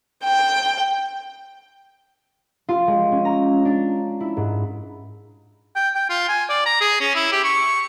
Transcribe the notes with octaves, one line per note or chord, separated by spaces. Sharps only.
G5
F4
G#3
C#4
A#5
D4
E4
G#2
G5
G5
F4
G#5
D5
A#5
G#4
C#4
E4
G4
C#6